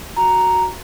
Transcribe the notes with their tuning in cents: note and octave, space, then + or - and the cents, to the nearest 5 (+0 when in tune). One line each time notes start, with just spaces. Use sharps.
F#4 +0 A#5 +0